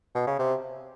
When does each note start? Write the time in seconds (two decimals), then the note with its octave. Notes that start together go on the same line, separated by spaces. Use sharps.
0.15 B2
0.27 C#3
0.39 C3